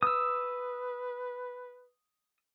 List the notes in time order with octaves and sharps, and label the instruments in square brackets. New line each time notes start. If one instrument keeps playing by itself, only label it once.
[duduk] B4 [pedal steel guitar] D#6 E6